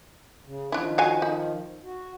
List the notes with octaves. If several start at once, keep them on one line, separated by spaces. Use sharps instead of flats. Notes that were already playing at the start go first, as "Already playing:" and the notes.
C#3
D#3 F3 D4 E4
F#4 F5 G#5
D#4
F#4